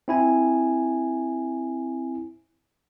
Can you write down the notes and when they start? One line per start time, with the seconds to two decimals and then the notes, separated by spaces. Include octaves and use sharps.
0.08 C4 E4 G#5